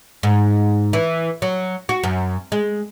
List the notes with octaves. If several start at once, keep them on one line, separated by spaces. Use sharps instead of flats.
G#2
E3
F#3
F#4
F#2
G#3